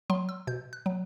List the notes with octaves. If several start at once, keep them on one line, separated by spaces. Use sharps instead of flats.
F#3 C6
E6
B2 G6
F#6
F#3